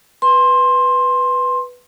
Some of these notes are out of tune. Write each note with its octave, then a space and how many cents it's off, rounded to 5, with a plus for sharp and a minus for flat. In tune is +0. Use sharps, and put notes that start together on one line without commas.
B4 +0 C6 +15